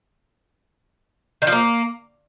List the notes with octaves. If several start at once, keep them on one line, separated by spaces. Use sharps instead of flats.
D#3
F3
A#3